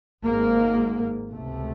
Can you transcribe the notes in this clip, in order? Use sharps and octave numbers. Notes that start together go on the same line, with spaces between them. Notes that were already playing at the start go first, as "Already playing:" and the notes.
G#1 G#2 A#3
C#2 C3 A3